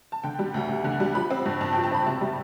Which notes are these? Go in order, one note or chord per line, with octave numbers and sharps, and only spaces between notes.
A5
D3 G5
G3
D2
D2
D3
G3
F3 B5
C4
G2
G2 A5
F3 G5
A5
C4 B5
C3 A5
G3